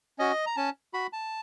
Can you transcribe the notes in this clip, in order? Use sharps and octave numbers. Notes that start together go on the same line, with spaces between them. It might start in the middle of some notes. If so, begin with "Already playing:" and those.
C#4 F#4 D#5
A#5
C#4 A5
F#4 B5
A5